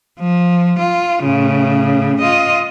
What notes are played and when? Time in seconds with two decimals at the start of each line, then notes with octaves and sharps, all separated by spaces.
0.20 F3
0.79 F4
1.23 A2 C#3
2.21 F4 D#5